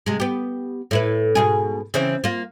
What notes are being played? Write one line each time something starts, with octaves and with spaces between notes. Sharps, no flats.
C3 G#3
B3 G4
A2 E4 B4
G#2 B2 G#4
C#3 E3 C4
A#3 F4